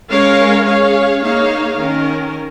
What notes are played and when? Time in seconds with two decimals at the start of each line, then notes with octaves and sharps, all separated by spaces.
0.11 G#3 C#4 A#4 C#5 F5
0.67 C#4 G#4 C#5 F5
1.22 A#3 D#4 G#4 C#5 F5
1.78 D#3 C#4 A#4